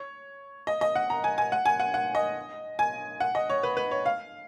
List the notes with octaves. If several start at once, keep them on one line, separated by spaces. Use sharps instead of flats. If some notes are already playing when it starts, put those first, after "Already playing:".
Already playing: C#5
D#5
D#5
F#5
A#5
G#5
G#5
F#5
G#5
F#5
F#5
D#5
G#5
F#5
D#5
C#5
B4
B4
C#5
F5